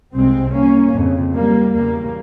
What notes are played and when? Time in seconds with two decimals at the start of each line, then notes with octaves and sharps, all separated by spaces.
0.13 C2 C3 G#3 C4
0.53 A#3 C#4
0.93 F2 C#3
1.34 G3 A#3
1.73 E2 C#3 G3 A#3